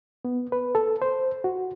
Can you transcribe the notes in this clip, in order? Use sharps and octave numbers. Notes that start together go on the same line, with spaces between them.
B3
B4
A4
C5
F#4